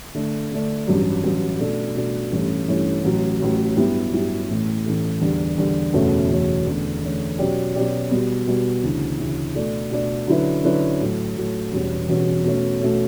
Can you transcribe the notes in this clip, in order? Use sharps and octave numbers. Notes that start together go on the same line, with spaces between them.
D3 A3 D4
D3 A3 D4
A1 G2 F#3
A1 G2 F#3
B2 A3 D4 A4
B2 A3 D4 A4
A1 G2 E3 A3 C#4
A1 G2 E3 A3 C#4
A1 A2 F#3
A1 A2 F#3
G2 F#3 B3 E4 G4
G2 F#3 B3 E4 G4
A1 A2 E3 A3
A1 A2 E3 A3
E2 D3 G3 D4
E2 D3 G3 D4
F#1 E2 B2 A3 C#4
F#1 E2 B2 A3 C#4
E2 D3 A3 C#4
E2 D3 A3 C#4
B2 F#3 C#4 G4 D5
B2 F#3 C#4 G4 D5
B2 G3 B3
B2 G3 B3
D2 C#3 E3
D2 C#3 E3
B2 A3 D4 A4 D5
B2 A3 D4 A4 D5
D3 F#3 C#4 E4 B4
D3 F#3 C#4 E4 B4
A2 F#3 A3
A2 F#3 A3
E1 E2 B2 G3 C#4
E1 E2 B2 G3 C#4
B2 A3 C#4
B2 A3 C#4